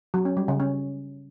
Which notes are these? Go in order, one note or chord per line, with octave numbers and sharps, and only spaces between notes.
F#3
C#4
G3
C#3
C#4